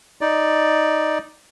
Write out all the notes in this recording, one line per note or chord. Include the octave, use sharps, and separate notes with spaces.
D#4 D5